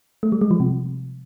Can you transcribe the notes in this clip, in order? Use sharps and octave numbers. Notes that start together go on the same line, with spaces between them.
A3
G3
G#3
F3
C3